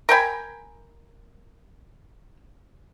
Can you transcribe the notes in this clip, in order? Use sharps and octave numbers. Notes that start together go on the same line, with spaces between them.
A#4 G5 G#5 B5